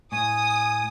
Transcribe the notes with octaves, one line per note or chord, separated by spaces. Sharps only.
A2 G#5 D#6